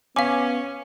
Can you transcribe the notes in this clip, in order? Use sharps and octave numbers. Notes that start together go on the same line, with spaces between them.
B3 C#4 F5 G#5 D6